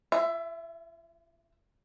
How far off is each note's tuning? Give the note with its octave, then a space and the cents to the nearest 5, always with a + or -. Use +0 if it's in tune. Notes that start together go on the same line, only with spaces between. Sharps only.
F4 -40 E5 +15